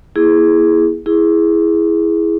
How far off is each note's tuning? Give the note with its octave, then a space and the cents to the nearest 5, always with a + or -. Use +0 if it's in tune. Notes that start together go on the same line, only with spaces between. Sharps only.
A#3 +45 E4 +0 G#4 +0
E4 +0 G#4 +0